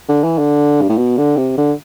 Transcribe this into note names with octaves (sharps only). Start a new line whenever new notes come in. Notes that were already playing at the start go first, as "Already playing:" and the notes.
D3
E3
D3
G2
A2
B2
D3
C3
D3